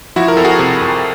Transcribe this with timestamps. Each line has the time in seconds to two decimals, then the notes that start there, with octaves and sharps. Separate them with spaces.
0.16 F3 E4 F#4
0.28 A#4
0.37 F2 A4
0.45 F#4 G#4
0.59 C3
0.81 F2